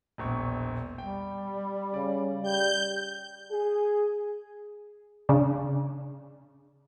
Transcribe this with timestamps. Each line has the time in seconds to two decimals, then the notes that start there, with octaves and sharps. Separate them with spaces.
0.18 E1 A#1 C#6
0.98 G3 G5
1.94 C#3 D5
2.43 G3 G6
3.51 G#4
5.29 C#3 D4